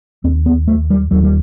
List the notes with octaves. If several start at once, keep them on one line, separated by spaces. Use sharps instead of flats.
D#2 C4
B3
A3
G3
D#2 F#3
G3